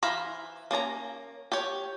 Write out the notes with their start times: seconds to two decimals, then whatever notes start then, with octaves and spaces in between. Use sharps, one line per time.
0.03 E3 C5 F5 A#5 B5
0.71 A#3 C#4 D5 A#5
1.52 G4 C#5